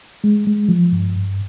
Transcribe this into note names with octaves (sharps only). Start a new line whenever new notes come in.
G#3
G#3
F3
G2
G2